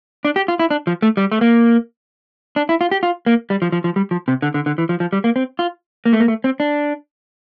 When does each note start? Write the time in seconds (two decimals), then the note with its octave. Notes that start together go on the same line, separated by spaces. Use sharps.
0.25 D4
0.36 G4
0.48 F4
0.59 E4
0.70 D4
0.87 F3
1.02 A3
1.17 G3
1.32 A3
1.41 A#3
2.56 D4
2.69 E4
2.81 F4
2.92 G4
3.03 F4
3.26 A#3
3.50 G3
3.62 F3
3.72 F3
3.84 F3
3.96 G3
4.11 F3
4.28 C3
4.42 D3
4.54 D3
4.66 D3
4.78 E3
4.89 F3
5.00 F3
5.13 G3
5.24 A#3
5.36 C4
5.59 F4
6.06 A#3
6.13 A3
6.20 A#3
6.28 A3
6.44 C4
6.60 D4